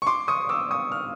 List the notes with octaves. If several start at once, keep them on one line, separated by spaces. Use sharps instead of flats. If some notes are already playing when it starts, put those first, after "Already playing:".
C#6
C6 D6
C#6 D#6
D6 E6
C#6 D#6
F6